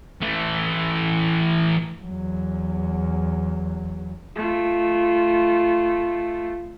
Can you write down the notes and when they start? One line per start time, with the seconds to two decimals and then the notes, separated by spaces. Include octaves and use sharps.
0.21 E3 A3
2.03 E2 F#3
4.36 A3 F4